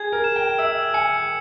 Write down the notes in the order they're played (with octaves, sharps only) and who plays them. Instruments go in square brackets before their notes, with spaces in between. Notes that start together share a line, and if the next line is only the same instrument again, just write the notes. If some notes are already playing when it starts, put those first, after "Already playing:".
Already playing: [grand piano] G#4 [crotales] G#6
[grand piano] A#4
[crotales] E7
[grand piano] G5
[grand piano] E5 [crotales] E6
[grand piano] G#5 [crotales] C#7